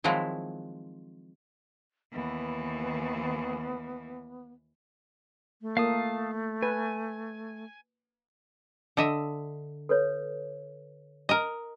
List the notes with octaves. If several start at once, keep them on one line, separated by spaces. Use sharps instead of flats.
D#3 F3 F#3 G#3 C4 E4
D#2 E3 B3
A3
A#3 F5 A5 D#6
B4 G#5
D3 D#5 E5
A4 B4 C#5
A#4 D#5